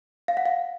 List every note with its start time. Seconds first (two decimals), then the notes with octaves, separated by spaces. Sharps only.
0.28 F5
0.37 F#5
0.46 F5